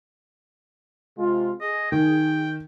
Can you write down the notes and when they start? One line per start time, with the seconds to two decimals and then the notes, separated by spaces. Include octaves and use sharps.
1.18 C3 G#3 F4
1.61 G#4 D#5
1.92 D#3 G5